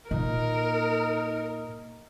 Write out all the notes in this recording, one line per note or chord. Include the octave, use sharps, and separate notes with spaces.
A#2 D#4 A#4